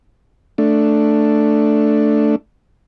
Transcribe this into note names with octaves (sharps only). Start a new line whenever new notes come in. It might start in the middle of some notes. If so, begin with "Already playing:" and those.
A3 D4